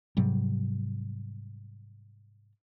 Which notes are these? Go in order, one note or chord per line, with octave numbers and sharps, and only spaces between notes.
G#2 C3 F#3 G3